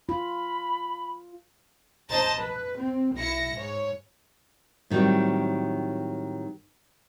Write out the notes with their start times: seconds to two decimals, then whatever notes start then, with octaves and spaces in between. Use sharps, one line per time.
0.09 F4 B5
2.09 C5 D#5 A5 A#5 A6
2.40 B4
2.78 C4
3.15 B1 E4 A#6 C#7
3.54 G#2 C#5
4.90 A2 D#3 F#3 G3 C4